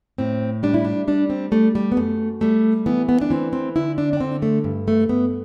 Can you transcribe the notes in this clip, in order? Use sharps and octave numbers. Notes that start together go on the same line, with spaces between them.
A2 C4
G3 D4
E4
D4
G3 D4
C4
G3 A3
G3
B3
F#2 A3
G3 A3
E3 B3
B3
D4
E3 C4
C4
D3 E4
D4
D4
D3 C4
A3
G2
A3
G2 B3